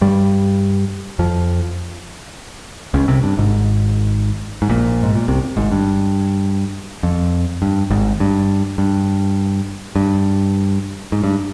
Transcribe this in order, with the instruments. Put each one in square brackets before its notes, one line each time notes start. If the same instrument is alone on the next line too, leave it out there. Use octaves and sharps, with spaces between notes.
[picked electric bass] G2 G3
F2 F3
C#2 C#3
C2 C3
G2
G#1 G#2
G#2
A#1 A#2
G#2
A#2
C2 C3
G#1 G#2
G2
F2
G2
G#1 G#2
G2
G2
G2
G#2
G2